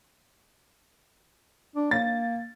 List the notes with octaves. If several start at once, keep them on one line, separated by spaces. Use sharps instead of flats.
D4
A#3 A6